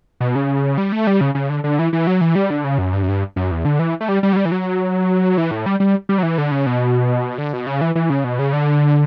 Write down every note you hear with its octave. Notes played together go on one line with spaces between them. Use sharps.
B2
C#3
G3
A3
G3
C#3
C#3
D3
D3
E3
E3
F#3
E3
G3
D3
C#3
F#2
G2
F#2
G2
F#2
E2
D3
E3
A3
G3
G3
F#3
G3
E3
F#3
E3
A2
G3
G3
G3
F#3
E3
D3
C#3
B2
D3
B2
C#3
E3
E3
C#3
B2
C#3
D3